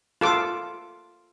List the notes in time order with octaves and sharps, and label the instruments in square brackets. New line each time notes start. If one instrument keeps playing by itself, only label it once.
[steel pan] F4 A4 D6